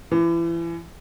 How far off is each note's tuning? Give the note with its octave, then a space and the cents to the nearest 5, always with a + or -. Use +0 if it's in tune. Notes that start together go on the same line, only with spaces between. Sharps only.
E3 +30